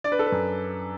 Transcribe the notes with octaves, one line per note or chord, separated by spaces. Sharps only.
D4 D5
B4
A4
B4
F#2